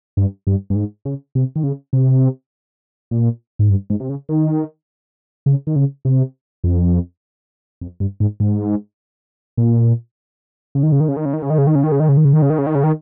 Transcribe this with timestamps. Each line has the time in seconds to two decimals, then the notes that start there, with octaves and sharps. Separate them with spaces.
0.17 G2
0.47 G2
0.70 G2
0.75 G#2
1.05 C#3
1.35 C3
1.56 D#3
1.63 C#3
1.93 C3
3.11 A#2
3.59 G#2
3.70 G2
3.90 G#2
4.00 C3
4.09 C#3
4.29 D#3
5.46 C#3
5.67 D#3
5.76 C#3
6.05 C3
6.64 F2
7.81 F2
8.00 G2
8.20 G#2
8.40 G#2
9.57 A#2
10.75 C#3
10.83 D#3
10.92 C#3
11.00 D#3
11.08 C#3
11.17 D#3
11.26 C#3
11.33 D#3
11.42 C#3
11.50 D#3
11.58 C#3
11.67 D#3
11.75 C#3
11.84 D#3
11.92 C#3
12.00 D#3
12.09 C#3
12.17 D#3
12.25 C#3
12.33 D#3
12.42 C#3
12.50 D#3
12.58 C#3
12.67 D#3
12.75 C#3
12.84 D#3